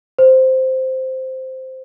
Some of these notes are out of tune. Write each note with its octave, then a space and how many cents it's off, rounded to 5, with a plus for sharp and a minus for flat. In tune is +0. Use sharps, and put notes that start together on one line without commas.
C5 -5